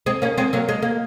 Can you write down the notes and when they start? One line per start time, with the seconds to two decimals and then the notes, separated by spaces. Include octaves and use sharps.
0.06 G#3 C4
0.22 A#3 C#4
0.38 G#3 C4
0.53 F#3 A#3
0.69 G#3
0.82 A#3